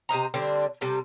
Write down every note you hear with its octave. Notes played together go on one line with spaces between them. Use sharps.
C3 C5 D#5 A#5
D3 G3 C4 D4
C3 G3 A4